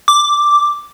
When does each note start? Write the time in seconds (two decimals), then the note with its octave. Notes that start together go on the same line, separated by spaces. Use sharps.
0.08 D6